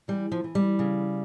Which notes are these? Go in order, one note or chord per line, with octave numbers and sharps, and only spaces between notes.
E3 G3
F3
E3
G3
C#3